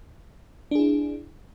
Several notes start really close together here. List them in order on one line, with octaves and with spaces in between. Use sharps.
D4 G#4 E4